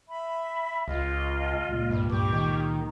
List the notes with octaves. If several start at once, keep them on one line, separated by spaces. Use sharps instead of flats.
E5 B5
C#2 F4 D#5
C#2 A#2
G2
G2 G4 C#6 D6
D#3